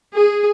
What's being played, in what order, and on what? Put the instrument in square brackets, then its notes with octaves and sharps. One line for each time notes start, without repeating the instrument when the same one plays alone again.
[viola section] G#4